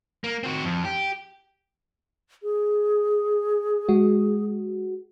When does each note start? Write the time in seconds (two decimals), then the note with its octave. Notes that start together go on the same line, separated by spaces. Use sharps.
0.24 A#3
0.43 C4 F#4
0.64 F2
0.85 G4
2.43 G#4
3.89 G#3 F#4